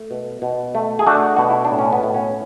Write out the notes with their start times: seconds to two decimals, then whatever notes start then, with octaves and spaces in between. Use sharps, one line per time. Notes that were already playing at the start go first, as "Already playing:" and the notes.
Already playing: A3
0.11 B2
0.42 B2
0.75 A3
0.99 G#4
1.07 A3 D4 F#4
1.37 B2 F#4
1.50 E4
1.65 D4
1.71 A2
1.79 C#4
1.93 B3
2.03 A2
2.14 C#4